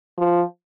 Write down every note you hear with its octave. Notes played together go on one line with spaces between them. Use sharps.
F3